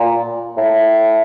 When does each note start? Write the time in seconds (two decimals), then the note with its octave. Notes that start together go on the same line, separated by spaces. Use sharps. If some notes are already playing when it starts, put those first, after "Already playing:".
Already playing: A#2
0.57 A2